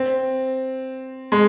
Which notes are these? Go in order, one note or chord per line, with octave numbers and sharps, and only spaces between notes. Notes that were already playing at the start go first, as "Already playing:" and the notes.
Already playing: C4
G#3